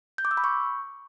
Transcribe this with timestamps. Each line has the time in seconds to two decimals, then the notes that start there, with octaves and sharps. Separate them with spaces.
0.18 G6
0.25 D6
0.31 E6
0.37 B5
0.44 C#6